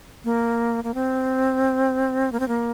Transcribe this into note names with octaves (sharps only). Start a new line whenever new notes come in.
A#3
A#3
C4
A#3
C4
A#3